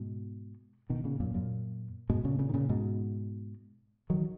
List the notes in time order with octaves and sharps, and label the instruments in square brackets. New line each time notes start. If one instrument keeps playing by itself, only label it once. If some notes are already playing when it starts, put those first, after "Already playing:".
Already playing: [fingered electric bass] G#2 B2
B2 D#3
A#2 C#3
F#2 A#2
F#2 A#2
G#2 B2
A#2 C#3
A#2 C#3
D#3
A#2 C#3
G#2 B2
D#3 F#3